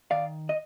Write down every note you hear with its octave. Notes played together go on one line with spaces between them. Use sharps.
D#3 D5 F5
D#5